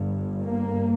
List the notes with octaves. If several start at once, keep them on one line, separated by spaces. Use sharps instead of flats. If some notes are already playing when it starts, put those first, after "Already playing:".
Already playing: G1 G2
A#3